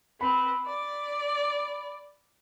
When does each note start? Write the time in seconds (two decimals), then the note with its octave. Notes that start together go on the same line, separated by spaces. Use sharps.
0.21 C4 B4 B5
0.66 D5